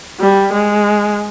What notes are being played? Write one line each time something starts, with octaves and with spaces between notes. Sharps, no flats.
G3
G#3